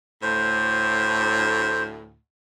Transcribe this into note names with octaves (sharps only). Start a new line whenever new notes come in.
D2 A2 C5